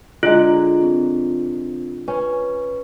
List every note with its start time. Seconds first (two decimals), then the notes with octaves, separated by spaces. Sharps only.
0.23 D3 G#3 F4
0.83 C4
2.08 C#4 B4